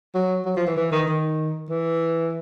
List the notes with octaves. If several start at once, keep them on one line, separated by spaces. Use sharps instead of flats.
F#3
F#3
F3
E3
E3
D#3
D#3
E3